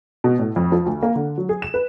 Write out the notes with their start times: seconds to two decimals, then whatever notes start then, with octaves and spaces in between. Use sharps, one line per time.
0.24 B2
0.39 A2
0.56 F2
0.72 F3
0.86 D2
1.03 A#3
1.16 D3
1.38 F#3
1.49 G#4
1.62 E7
1.74 B4